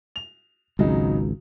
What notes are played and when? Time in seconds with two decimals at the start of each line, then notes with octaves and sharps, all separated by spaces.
0.16 F7
0.79 G#1 C#2 C#3 F#3 D#4